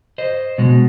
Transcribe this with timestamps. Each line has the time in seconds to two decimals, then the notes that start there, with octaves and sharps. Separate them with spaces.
0.18 C5 D#5
0.58 B2 G#3